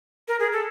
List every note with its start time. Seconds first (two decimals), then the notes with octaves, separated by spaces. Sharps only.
0.28 A#4
0.40 G#4
0.52 A4